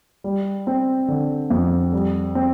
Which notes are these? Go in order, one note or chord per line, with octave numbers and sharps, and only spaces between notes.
G3
C4
D3
F2
G3
C4